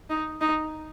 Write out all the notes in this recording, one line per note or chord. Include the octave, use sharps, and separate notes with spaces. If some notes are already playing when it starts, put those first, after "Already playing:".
D#4
D#4